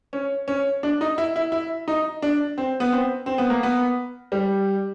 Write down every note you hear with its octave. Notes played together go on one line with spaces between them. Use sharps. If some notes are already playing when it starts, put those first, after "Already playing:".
C#4
C#4
D4
D#4
E4
E4
E4
D#4
D4
C4
B3
C4
C4
B3
A#3
B3
G3